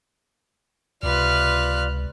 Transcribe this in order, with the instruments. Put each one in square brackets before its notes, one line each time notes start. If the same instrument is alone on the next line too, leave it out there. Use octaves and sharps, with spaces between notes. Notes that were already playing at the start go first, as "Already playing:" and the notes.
[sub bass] C#2 [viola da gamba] C3 B4 [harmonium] F4 D5 [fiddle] F6 F#6